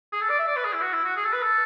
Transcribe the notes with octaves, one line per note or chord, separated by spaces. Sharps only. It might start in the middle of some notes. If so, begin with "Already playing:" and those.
G#4
A4
D5
E5
D5
B4
G#4
E4
F#4
E4
F#4
G#4
A4
B4
A4